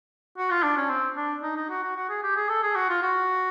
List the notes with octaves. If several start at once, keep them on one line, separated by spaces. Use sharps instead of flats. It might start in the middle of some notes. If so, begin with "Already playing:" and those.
F#4
F4
D4
C#4
C4
D4
D#4
D#4
F#4
F#4
F#4
G#4
G4
G#4
A4
G#4
F#4
F4
F#4